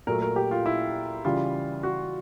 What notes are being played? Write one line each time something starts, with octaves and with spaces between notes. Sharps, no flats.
A#2 F#3 A3 A#4
A#4
G4
F4
E4
C#3 E3 G3 F4
F#4